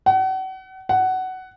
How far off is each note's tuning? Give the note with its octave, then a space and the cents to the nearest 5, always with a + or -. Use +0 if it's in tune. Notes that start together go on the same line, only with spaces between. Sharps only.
F#5 +40
F#5 +15